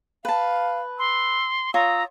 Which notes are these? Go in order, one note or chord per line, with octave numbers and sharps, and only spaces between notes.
B4 F5 A5
C6 E6
F4 C#5 A#5 D#6 E6